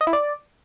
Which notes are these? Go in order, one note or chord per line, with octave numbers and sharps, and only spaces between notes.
D#5
E4
D5